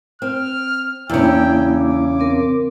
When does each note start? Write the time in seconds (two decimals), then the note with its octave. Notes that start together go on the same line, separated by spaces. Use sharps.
0.22 C4 F6
1.10 E2 C#3 A#3 D4 E4 G5
1.76 D6
2.20 C4 A#4